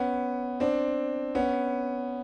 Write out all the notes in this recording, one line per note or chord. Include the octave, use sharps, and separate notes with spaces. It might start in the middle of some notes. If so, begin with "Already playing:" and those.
Already playing: B3 C#4
C4 D4
B3 C#4